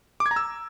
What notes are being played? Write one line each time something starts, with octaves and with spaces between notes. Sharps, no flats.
D6
G#6
A#5
E6